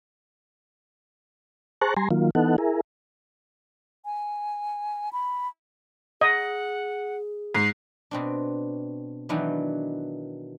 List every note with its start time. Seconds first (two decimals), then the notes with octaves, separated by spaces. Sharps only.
1.81 G#4 C5 A5 A#5 C#6 F#6
1.97 G3 G#5 A#5 C6
2.11 D#3 F#3 A#3 F4
2.35 E3 B3 D#4 A4 F#5
2.58 E4 G#4 A#4
4.05 G#5
5.13 B5
6.21 G#4 D#5 F#5
7.55 G#2 C7
8.11 B2 C4 D4
9.29 D#3 E3 F#3 B3 D4